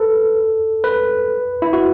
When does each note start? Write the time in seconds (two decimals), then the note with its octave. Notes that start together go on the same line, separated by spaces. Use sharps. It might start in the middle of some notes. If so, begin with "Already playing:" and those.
Already playing: A4 B4
0.84 B4
1.62 E4
1.73 F#4